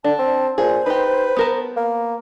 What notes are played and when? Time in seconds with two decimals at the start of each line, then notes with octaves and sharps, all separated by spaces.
0.04 D3 D4 A5
0.19 C4
0.58 A#2 G#4 C5
0.86 D#4 G4 B4
1.37 B3 A#4 A5
1.77 A#3